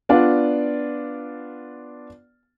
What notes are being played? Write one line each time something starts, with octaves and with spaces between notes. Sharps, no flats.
B3 D4 F4 D5 F#5